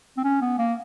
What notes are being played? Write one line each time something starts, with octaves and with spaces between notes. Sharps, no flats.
C4
C#4
B3
A#3